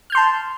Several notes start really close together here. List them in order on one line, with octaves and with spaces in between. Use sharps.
F6 G6 C6 A5